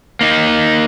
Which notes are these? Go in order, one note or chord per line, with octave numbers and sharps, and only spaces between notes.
A#3 D#4